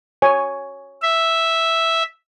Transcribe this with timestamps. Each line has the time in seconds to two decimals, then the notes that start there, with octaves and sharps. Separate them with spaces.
0.22 C#5 G#5
1.02 E5